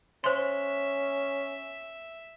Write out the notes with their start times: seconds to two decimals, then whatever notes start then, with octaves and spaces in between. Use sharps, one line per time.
0.24 C#4 C5 E5 C6